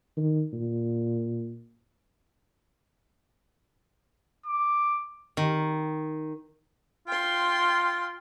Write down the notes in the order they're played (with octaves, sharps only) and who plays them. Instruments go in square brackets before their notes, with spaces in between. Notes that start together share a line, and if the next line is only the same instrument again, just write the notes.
[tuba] D#3
A#2
[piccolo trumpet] D6
[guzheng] D#3
[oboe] F4 [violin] G5 C6